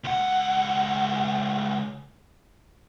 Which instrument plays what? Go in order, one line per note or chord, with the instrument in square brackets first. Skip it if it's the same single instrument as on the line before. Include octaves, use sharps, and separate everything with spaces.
[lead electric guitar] C#2 F#5